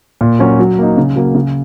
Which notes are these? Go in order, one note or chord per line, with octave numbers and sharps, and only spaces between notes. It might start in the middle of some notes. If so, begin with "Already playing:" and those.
A#2
F#3 C#4 F#4 A#4
F#3
A#3 D#4
C#3
F#3 A#3
C#3